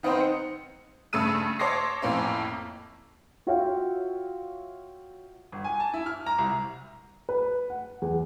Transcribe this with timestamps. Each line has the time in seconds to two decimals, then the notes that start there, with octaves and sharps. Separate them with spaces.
0.03 D#3 B3 C4 D#4 C5
0.21 C#7
1.13 G2 C#3 A3 A5 E6 D#7
1.59 C#5 A5 C6 D6 A#6 C7
2.02 F2 A2 A#3 C#4
3.47 F4 F#4 C#5 E5 F5 G5
5.52 G1
5.64 G#5
5.80 A5
5.94 E4
6.06 F6
6.26 A#5
6.38 C2
7.29 B4
7.70 F#5
8.02 E2